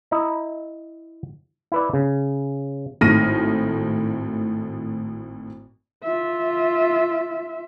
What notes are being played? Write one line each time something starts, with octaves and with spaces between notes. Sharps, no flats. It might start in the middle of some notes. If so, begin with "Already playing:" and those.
E4 D#5 A#5
E4 B4 D5
C#3
G#1 A2 A3 F6 A#6 D#7
F4 E5